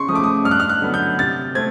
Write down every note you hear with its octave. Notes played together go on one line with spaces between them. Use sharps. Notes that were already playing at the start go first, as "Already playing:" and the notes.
Already playing: C#3 C6 C#6
F3 A3 D6 D#6
D#6
G2 F6
F#6
F6
F#6
D3 F#3 B3
G6
C3 A6
A3 C4 G#6